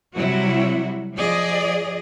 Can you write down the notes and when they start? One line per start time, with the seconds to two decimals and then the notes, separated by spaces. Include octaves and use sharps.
0.15 C3 F#3 G3 E4 F#4
1.17 F3 G#4 D5 D#5